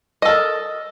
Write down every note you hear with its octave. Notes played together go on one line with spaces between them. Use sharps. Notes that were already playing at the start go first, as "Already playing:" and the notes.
A4 A#4 D#5